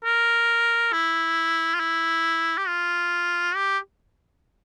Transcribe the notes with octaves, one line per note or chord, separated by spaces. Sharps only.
A#4
E4
F4
E4
G4
F4
G4